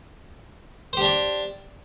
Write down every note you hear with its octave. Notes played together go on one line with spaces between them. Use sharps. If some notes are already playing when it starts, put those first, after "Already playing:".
D4 G4 C5 D5